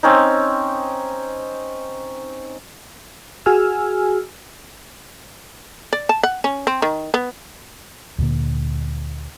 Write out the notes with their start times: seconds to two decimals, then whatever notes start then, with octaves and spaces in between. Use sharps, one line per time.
0.03 C4 C#4 D#4
3.46 F#4 G#4 G#5 E6 F6
5.93 D5
6.09 A5
6.23 F#5
6.44 C#4
6.67 C4
6.82 D#3
7.14 B3
8.18 D2 A#2 D3 A#3